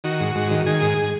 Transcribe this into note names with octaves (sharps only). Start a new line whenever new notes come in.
D#3 F#4
G#2
G#2
D#3
D#3 G#4
G#2